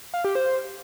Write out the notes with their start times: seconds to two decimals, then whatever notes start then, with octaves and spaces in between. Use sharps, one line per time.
0.14 F5
0.24 G4
0.35 C5